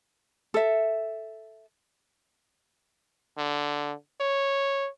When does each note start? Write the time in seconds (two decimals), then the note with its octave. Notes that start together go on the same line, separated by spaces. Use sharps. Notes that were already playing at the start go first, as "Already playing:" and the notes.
0.54 A4 E5
3.38 D3
4.21 C#5